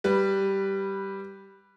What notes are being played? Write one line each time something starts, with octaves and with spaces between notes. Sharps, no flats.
G3 B4